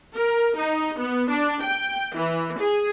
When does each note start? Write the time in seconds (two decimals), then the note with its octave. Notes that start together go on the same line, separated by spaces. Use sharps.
0.13 A#4
0.56 D#4
0.98 B3
1.30 D4
1.61 G5
2.14 E3
2.58 G#4